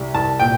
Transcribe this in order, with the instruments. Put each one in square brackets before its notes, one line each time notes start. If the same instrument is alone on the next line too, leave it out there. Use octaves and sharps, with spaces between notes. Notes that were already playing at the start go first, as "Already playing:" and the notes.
Already playing: [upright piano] C2 G3
[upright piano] C2 [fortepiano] A5
[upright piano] A#2 [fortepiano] G5